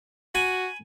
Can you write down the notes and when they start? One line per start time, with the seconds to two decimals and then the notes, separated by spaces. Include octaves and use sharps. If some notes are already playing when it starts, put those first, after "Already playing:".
0.35 F#4 G#5 B5